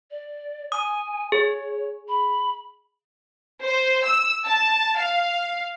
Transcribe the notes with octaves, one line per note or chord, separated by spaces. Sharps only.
D5
G#5 D#6
G#4 C#5
B5
C5
E6
A5
F5